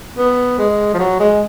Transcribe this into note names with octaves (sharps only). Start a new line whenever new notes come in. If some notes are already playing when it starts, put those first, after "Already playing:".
B3
G#3
F3
F#3
G#3